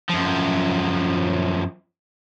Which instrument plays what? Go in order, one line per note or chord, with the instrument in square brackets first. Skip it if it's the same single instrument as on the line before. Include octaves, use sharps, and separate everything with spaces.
[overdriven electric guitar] F#2 F3